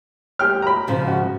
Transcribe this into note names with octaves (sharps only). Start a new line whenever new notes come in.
G4 G5 F6
A#5 B5
G#2 C#3 F3
F#4